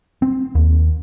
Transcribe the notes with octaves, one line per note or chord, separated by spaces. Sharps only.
C4
D#2